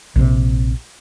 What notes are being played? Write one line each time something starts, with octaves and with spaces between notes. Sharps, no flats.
A#1 C3